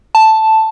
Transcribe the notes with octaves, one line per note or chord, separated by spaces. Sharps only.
A5